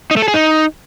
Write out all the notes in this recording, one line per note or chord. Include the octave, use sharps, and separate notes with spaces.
D#4
A3
A4
G#4
D#4